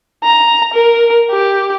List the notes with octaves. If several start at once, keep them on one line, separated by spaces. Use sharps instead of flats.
A#5
A#4
G4